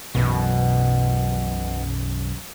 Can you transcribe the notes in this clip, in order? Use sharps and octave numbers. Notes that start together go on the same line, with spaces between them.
B1 F#2 B2 E3